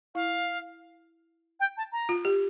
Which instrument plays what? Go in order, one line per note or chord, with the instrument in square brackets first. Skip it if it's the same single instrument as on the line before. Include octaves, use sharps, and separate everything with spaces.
[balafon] E4 [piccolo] F5
[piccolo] G5
A5
A#5
[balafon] F4
G4